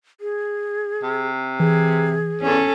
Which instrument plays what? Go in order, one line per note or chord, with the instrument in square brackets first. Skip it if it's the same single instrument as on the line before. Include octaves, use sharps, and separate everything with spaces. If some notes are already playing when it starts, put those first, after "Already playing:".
[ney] G#4
[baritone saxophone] C3
[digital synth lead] E3 [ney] G#4
[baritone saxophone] E2 [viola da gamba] C#4 A4